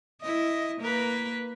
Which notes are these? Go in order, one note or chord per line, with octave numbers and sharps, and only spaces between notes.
E4 D#5
A#3 A#4 B4